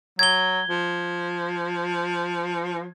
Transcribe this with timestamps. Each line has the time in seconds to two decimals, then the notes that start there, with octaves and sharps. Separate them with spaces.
0.19 F#3 G#6 G7
0.69 F3